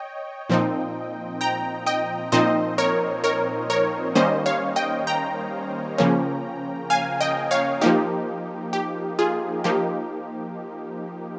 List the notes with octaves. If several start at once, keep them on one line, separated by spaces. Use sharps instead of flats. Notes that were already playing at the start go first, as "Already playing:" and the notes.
Already playing: C#5 D#5 G5
A#2 F3 C4 D#4
G5 A#5
D#5 G5
A#2 F3 C4 D#4 C5 D#5
A#4 C#5
A#4 C#5
A#4 C#5
D#3 G3 A#3 C#4 C5 D#5
C#5 F5
D#5 G5
G5 A#5
C#3 F3 A#3 C#4
F5 G#5
D#5 G5
C#5 F5
F3 A#3 D#4 G4
G4
F4 G#4
F3 A#3 D#4 G4